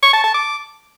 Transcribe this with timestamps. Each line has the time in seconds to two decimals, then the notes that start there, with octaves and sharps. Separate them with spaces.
0.03 C#6
0.13 A5
0.24 A5
0.34 D6